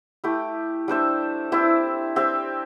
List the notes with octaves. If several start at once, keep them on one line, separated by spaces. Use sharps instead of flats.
A3 E4 G4
G3 D4 C5 E5
C4 E4 G4 E5
C4 G4 E5